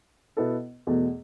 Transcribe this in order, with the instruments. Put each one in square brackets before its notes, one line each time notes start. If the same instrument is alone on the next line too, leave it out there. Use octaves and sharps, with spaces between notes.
[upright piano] B2 B3 E4 A4
E2 B2 A3